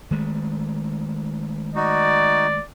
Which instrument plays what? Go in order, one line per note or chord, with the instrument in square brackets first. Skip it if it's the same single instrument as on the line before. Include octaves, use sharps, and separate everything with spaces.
[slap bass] D#3 G#3 A3
[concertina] D#4 F#4 [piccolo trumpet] D5